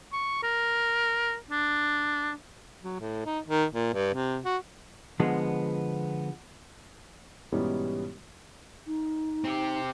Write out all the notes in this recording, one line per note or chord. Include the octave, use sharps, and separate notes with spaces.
C#6
A#4
D4
F#3
A2
D#4
D#3
A#2
G2
C3
F#4
D3 F3 G#3 B3
G#2 B2 E3 G3 B3 C#4
D#4
C4 G4